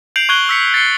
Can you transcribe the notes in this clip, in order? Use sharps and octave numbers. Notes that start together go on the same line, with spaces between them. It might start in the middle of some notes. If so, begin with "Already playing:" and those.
G6 C7 D7 F7 F#7
C#6 F#6 G#6 G7
E6 B6 C#7
A6 C7 C#7 G7